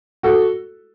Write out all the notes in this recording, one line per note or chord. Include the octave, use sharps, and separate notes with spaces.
F#4 A4